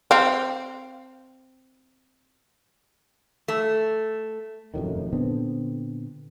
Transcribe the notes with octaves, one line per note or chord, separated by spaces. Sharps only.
C4 F5
A3
F1 F#2 A2 D#3
A#2 D3 B3 C4